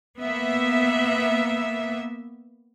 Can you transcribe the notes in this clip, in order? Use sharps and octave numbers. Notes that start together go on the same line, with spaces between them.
A#3 B3 E5